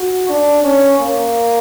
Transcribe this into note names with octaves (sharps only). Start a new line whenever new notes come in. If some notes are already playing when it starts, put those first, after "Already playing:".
Already playing: F#4
D4
C#4
A#3